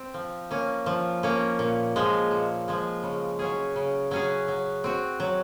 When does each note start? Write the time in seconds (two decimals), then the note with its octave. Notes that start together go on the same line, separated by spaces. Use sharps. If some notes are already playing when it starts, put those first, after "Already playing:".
Already playing: C4
0.14 F3
0.51 A#3 C#4
0.86 F3
1.23 A#3 C#4
1.59 A#2
1.96 F3 G#3
2.31 A#2
2.68 F3 G#3
3.03 C#3
3.39 F#3 C#4 G#4
3.76 C#3
4.11 F#3 C#4 G#4
4.48 F#3
4.84 C4 F#4
5.20 F#3